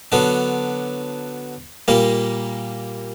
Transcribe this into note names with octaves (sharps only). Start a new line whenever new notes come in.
D3 F#3 B3 D4
A#2 G3 A#3